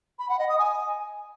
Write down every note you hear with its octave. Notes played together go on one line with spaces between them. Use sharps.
B5
F#5
D#5
D#6
G#5